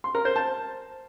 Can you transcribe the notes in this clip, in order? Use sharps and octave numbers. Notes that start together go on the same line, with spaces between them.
C6
A#4
C5
A5